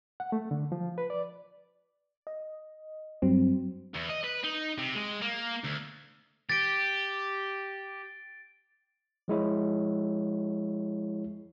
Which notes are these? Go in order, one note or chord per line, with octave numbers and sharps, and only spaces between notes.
F#5
A3
D3
F3
B4
D5
D#5
G2 F#3 C4
E2
D#5
B4
D#4
C3
G#3
A#3
D2
G4 A6 D7
F3 G#3 E4 C#5